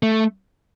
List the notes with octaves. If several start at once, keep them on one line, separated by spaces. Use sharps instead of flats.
A3